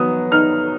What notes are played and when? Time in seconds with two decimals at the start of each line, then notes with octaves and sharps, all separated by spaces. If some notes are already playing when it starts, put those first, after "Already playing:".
Already playing: F#3 B3 D#6
0.32 D#4 F6